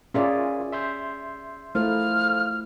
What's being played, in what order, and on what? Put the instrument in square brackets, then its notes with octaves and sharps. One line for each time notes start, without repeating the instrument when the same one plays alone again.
[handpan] C#4 G#4 D5 [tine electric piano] F4 A#4 E5
[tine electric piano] E5 C6 G6
[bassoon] F3 [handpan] A3 E4 A#4 [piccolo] F6